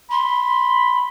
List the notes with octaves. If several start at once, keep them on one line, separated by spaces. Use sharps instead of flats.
B5 C6